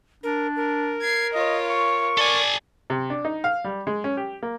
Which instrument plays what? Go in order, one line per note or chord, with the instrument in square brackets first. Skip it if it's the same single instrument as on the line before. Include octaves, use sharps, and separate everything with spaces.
[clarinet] D4 [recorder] A#4
[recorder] A#4
[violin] G#6 C7
[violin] F4 C#5 [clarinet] D#5
[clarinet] C#6
[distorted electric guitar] A4 G#5 [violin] D5
[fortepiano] C3
D4
D#4
F5
G3
G#3
C#4
G4
A#3